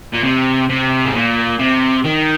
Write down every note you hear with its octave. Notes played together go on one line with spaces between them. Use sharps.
A#2
C3
C3
G#2
A#2
C3
D#3